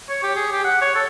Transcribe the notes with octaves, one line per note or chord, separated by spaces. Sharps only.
C#5
G4
G#4
G4
F#5
C#5
A4